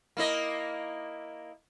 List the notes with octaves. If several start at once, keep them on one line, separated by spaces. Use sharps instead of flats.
A#3 E4 D#5